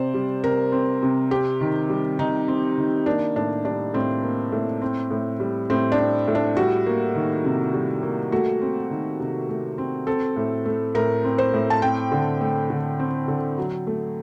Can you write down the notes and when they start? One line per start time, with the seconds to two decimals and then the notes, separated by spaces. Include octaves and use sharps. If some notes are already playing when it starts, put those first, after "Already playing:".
Already playing: C3 C4 C5 D5
0.14 G3
0.44 C3 A#4
0.72 C4
1.03 C3
1.31 C4 G4
1.61 D#3
1.90 G3
2.19 D#3 D#4
2.48 C4
2.78 D#3
3.06 A#3 D4
3.36 A2 D4
3.65 G3 D4
3.94 A2 C4
4.23 A#3
4.52 A2
4.82 C4
5.11 A2
5.40 G3
5.70 A2 C4
5.92 D4
5.99 C4
6.28 A2
6.35 D4
6.57 G3 F#4
6.86 A#3
7.15 D#3
7.45 C3
7.74 G3
8.03 A#3
8.32 A3 F#4
8.61 C4
8.91 D#3
9.20 C3
9.49 A3
9.78 C4
10.07 C4 A4
10.36 A2
10.65 A3
10.95 A2 A#4
11.24 C4
11.38 C5
11.54 A2
11.70 A5
11.82 C4 G5
12.12 D3
12.41 A3
12.70 D3
13.00 C4
13.28 D3
13.58 F#3
13.87 A3